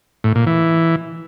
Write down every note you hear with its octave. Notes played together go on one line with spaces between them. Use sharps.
A2
A#2
E3